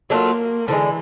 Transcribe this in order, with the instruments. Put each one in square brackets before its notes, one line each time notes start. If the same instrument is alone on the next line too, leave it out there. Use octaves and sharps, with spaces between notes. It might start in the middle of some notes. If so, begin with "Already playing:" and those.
[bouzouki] F#3 A3 D4 F4 [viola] A#3
[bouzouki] D3 F3 G#3 [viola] E3